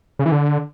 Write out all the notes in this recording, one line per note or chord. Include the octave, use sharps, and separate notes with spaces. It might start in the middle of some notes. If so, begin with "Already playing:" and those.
C#3
E3
D3